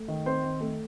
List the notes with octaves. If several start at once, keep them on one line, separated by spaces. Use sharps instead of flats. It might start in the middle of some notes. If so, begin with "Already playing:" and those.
Already playing: A3
D#3
C4 C5
D#3
A3